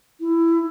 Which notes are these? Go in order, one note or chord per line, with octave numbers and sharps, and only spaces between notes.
E4